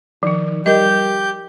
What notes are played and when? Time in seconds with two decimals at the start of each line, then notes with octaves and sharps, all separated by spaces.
0.23 D#3 F3 D#4
0.66 G3 G4 A#4 D#5 G6